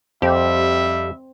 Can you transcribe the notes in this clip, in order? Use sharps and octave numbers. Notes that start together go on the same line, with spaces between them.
F2 G3 C4 G4 E5